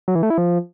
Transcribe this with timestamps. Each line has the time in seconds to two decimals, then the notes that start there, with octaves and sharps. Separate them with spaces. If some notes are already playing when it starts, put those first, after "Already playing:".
0.08 F#3
0.15 E3
0.23 A3
0.30 E4
0.38 F3